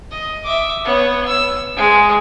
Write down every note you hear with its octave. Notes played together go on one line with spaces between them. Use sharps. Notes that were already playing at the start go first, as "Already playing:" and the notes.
D#5
E5 D6
B3 C#5
E6
G#3 G#4